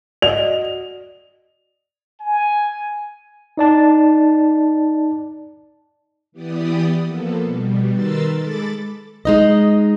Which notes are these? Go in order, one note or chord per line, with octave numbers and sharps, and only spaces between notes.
F#4 D5 D#5 F7
G#5
D#4 D5 A5
E3 B3 G4 D5 D#6
F3 A#3 B3 A4
B2 G3
D#3 A#4 B4 C6 E6 A6
G#3 A4 B5 D6 A6
G#3 D#4 D#5